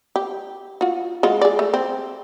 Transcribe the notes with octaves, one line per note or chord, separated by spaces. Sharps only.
G4
F4 F#4
G#3 F4 F#4
G#4 D5
A3
C4